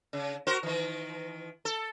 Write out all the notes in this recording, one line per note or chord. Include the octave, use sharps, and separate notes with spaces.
C#3
F#4 A#4 C5
D#3 E3
A4